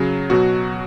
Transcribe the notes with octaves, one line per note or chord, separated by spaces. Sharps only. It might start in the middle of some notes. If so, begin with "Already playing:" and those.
Already playing: C#3 F#3
B2 F#3 F#4